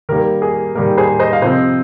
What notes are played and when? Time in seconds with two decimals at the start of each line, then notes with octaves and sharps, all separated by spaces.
0.09 D#3 G3 A#3 A#4
0.42 G#4
0.75 D#3 G3 A#3 A#4
0.98 G#4 C5
1.20 C5 D#5
1.33 F5
1.42 C3 F3 C4 C5 D#5